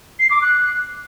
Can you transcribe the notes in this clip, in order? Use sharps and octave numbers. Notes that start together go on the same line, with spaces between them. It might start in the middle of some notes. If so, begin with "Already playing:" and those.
C7
D6
F#6